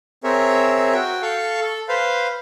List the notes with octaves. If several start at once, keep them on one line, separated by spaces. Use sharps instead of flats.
C4 G#4 A#4 C#5 E5
F#4 G5
A4 F5 C#6
A4
B4 C5 F5